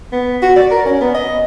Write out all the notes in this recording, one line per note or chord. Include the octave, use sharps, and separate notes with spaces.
B3
F#4
D5
A#4
C#4
B3
D#5